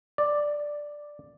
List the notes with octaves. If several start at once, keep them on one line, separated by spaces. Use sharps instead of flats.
D5